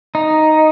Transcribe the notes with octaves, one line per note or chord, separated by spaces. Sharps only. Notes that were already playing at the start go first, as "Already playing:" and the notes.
D#4